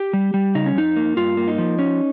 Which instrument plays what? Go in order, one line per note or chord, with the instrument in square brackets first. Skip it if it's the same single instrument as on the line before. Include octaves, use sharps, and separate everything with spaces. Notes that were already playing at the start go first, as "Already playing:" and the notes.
Already playing: [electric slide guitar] G4
G3
G3
C#3 D#4
C#4
F2 D#4
A#3
G2 F4
A#3
D#4
F3
C#4